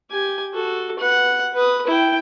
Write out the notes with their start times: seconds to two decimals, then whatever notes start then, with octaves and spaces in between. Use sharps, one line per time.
0.11 G4 G#5
0.54 F#4 A4
0.99 B4 F#5
1.54 B4 D#6
1.87 E4 G5